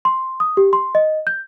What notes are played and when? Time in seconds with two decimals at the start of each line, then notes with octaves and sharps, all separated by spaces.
0.05 C6
0.40 D#6
0.57 G4
0.73 C6
0.95 D#5
1.27 G6